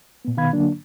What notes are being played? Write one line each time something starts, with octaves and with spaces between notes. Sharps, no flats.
A#2 B3
B2 D#3 B3 F5 B5 G#6
D3 F#3 A#3 D4